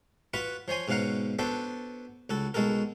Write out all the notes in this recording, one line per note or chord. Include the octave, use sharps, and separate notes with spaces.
F4 F#4 B4 F#5 B5
F3 C5 C#5 G#5 C6
G#2 B2 C#4 F5 F#5 A#5
B3 D4 F#4 A4 C5
C#2 F#4 A4
B1 G#3 F#4 A4 A#4